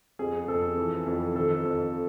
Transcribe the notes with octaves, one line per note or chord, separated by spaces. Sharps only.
F2 G#4
F2 A4
E3
F2
D#3 A4
F2